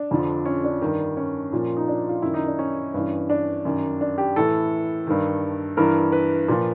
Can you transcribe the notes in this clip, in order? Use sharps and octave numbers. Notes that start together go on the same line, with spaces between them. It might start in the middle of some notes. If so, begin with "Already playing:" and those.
Already playing: D4
F2 D3 F3
C#4
D4
G2 D#3
C#4
A#2 F3
D#4
D4
F4
F#2 D#3 E4
D#4
D4
C#4
G2 E3
D4
F#2 D#3
D4
G4
A2 E3 A4
G2 D#3
G2 E3 A#4
B4
A#2 F3